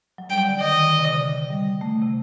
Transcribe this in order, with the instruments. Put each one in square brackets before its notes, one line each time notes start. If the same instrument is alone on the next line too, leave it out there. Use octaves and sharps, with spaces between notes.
[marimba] F#3
[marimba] G3 [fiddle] G5
[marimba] D3
[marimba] D#3 [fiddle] D#5
[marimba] D3
C3
D3
G3
A3
C3